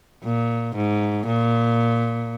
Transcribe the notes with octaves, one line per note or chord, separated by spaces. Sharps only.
A#2
G#2
A#2